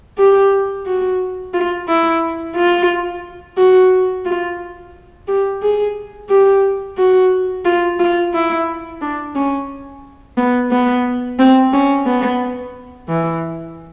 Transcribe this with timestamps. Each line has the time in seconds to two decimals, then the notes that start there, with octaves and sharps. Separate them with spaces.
0.18 G4
0.86 F#4
1.54 F4
1.88 E4
2.56 F4
3.58 F#4
4.26 F4
5.28 G4
5.62 G#4
6.29 G4
6.98 F#4
7.65 F4
8.00 F4
8.33 E4
9.01 D4
9.35 C#4
10.37 B3
10.71 B3
11.39 C4
11.73 C#4
12.06 B3
13.09 E3